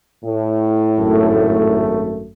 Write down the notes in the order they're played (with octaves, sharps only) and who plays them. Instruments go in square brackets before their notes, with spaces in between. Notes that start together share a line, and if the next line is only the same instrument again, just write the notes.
[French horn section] A2
[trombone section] G#1 F#2 A3